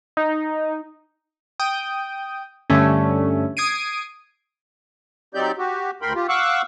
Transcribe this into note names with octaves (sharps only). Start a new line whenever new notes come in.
D#4
G5 D#6
G2 D3 A3 C#4
D#6 G#6 C7 D7 D#7
F#3 C4 D#4 G4 D5 G6
F#4 G4
D2 A#4 G5 B5 C6
F4 G4
F5 F#5 C#6 D6 E6 F#6